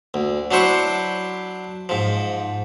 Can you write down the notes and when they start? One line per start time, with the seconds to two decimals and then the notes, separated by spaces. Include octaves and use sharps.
0.14 D2
0.51 F#3 D4 E4 C5 C#6
1.89 G#2 F3